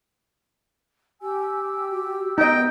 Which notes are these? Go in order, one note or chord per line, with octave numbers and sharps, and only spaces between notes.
G4 G#5 E6
F#4
B3 D#4 D#5 G5